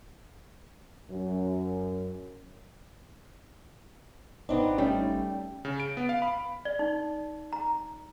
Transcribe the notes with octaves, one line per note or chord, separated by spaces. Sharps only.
F#2
G#1 B3 C4 D4 D#4
G3 A3 C#4
C#3
D7
B3
F5
B5
D5
D#4
A#5